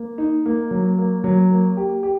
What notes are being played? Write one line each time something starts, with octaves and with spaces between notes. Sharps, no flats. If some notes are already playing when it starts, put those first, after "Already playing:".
Already playing: A#3
D#4
A#3
F#3
A#3
F#3
A#3
G4
G4